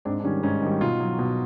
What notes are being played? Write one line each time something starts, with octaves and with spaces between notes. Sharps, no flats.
G#2 C4 D4
D4
D#3 G3 C#4
G#2 C#4
D#3 G3
B2 D#4 F4
F#3
B2